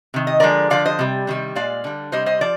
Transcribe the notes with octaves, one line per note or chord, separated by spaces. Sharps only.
C3 D#3
D#5
D3 F3 G#3 A#4 D5
D3 F3 D5 F5
C5 D#5
C3 G3
C3 D#3 G3
A#2 G#3 D5 F5
D3 G3
C3 G3 C5 D#5
C5 D#5
F3 D5